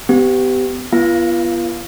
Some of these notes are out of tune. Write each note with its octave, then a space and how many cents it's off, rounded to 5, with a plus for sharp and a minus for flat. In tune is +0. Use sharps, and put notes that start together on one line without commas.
B3 +35 G4 -15
B3 -25 F4 -40 F5 +0